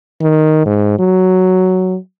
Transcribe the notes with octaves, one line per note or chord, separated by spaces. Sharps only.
D#3
G#2
F#3